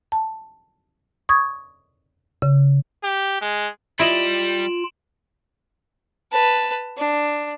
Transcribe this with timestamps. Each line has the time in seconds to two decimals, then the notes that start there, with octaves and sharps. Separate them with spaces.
0.12 A5
1.29 C#6 D#6 G#6
2.42 C#3
3.03 G4
3.41 G#3
3.99 G3 E4 F4 D#5 D7 E7 F#7
6.32 B4 A5
6.97 D4